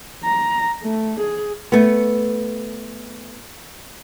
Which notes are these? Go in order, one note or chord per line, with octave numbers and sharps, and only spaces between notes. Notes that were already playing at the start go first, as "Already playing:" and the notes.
A#5
A3
G#4
A3 B3